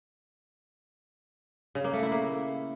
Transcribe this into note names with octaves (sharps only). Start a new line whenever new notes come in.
C#3
A#3
A3
E4
A#3